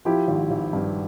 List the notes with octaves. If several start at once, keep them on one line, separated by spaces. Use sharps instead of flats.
F3 E4 G4
G#1
G#1
G2